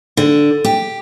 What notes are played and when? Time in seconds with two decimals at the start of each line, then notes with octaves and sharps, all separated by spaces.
0.17 D3
0.65 G4